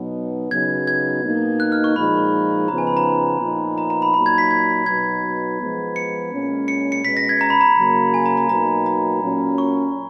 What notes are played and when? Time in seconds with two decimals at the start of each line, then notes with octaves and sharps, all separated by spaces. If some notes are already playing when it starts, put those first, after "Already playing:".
Already playing: B2 F#3 B3 D#4
0.51 C#3 F#3 B3 D#4 G#6
0.87 G#6
1.24 B2 A#3 D#4
1.60 F#6
1.72 F6
1.84 C#6
1.96 A#2 F3 G#3 D#4 B5
2.68 C#3 F3 B3 D#4 A#5
2.78 G#5
2.87 B5
2.97 A#5
3.41 A#2 F3 B3 D#4
3.78 A#5
3.90 A#5
4.02 B5
4.14 A#2 F#3 A#3 D#4 B5
4.26 G#6
4.38 B6
4.51 G#6
4.86 B2 F#3 B3 D#4 G#6
5.60 F3 G#3 B3
5.96 C#7
6.32 A#2 G#3 C#4
6.68 C#7
6.92 C#7
7.04 B2 G#3 C#4 B6
7.17 A#6
7.29 G#6
7.41 A#5
7.50 B5
7.61 A#5
7.77 C#3 F#3 A#3
8.14 G#5
8.26 A#5
8.37 A#5
8.49 B2 F#3 A#3 D#4 A#5
8.86 A#5
9.22 A#2 F#3 C#4
9.58 C#6